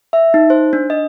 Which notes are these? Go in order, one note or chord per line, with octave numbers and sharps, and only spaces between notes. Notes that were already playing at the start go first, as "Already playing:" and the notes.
E5
D#4
C5
D4
D#5